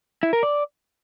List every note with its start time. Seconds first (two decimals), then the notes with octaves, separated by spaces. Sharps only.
0.23 E4
0.33 A#4
0.43 D5